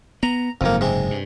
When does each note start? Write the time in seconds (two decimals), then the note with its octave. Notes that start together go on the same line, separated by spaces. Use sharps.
0.23 B3 A#5
0.61 F#1 F2 G#2 A#3
0.81 C3 G#3
1.11 G2